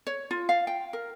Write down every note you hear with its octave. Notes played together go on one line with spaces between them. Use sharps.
C#5
F4
F5
G5
A#4